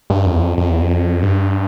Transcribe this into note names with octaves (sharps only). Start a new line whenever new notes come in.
G2
F2
E2
F2
F2
E2
F2
G2